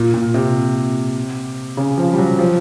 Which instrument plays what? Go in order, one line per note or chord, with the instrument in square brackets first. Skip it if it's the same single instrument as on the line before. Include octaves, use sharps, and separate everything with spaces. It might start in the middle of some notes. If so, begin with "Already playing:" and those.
Already playing: [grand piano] A#2
A#2
C3
C#3
F3
G3
F#3
F3